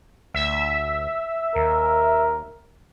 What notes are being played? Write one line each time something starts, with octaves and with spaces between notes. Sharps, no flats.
D2 E5
D#2 A#4